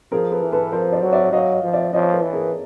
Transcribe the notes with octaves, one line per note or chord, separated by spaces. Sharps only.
F3 G#4 A#4
A4 B4
E3
A4 B4
F3 A#4 C5
C5 D5
F#3
D5 E5
F#3 D#5 F5
D#5 F5
F3
D5 E5
F3 C#5 D#5
A4 B4
E3
G#4 A#4